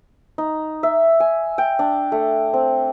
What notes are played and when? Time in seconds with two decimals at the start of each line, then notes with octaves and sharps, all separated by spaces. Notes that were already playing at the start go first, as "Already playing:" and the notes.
0.38 D#4
0.83 E5
1.20 G#5
1.58 G5
1.79 D4
2.12 A3
2.53 C4